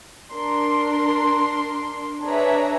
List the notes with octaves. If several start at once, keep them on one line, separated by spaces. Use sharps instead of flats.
D4 A#4 C6
D4 G#4 B4 C#5 E5 A#5